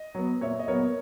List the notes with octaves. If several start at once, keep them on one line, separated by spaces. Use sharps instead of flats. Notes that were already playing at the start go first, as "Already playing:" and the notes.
Already playing: D#5
F#3 B3
A#2 C#5 E5
D#5
F#3 B3 A#4 C#5